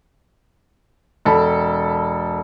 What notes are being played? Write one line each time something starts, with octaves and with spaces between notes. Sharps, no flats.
E1 A4 B5